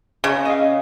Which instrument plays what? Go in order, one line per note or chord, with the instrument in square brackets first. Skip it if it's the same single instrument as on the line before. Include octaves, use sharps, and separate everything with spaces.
[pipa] C#3
[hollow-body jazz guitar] D#5 F5